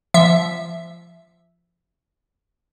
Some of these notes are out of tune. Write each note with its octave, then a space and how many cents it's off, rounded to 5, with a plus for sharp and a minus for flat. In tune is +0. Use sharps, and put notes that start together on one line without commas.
F3 -20 E5 +0